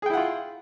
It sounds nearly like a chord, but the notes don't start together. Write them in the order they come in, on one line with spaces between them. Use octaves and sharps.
G#4 G5 E4 F#5 F4